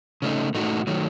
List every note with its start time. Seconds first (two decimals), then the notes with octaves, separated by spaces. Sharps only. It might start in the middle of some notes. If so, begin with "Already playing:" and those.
0.22 C#3 A3 D#4
0.54 A2 A3 D#4 F#4
0.87 D#3 F#3 A3